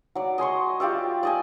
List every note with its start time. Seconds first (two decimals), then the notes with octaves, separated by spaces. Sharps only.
0.15 F#3 D5
0.38 D#5 G#5 C6 C#6
0.80 F4 G4 D5 E5
1.23 D5 D#5 G#5